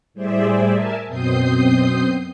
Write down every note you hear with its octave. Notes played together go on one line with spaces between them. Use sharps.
A2 G3 G#4 C5 D5 E5
A#4 E5 G#5 A5
F#2 B2 C4 D#6 G6 C7